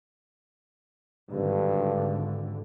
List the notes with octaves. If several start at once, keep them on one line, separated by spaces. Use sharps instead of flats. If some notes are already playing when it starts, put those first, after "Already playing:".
G#1 G2 D3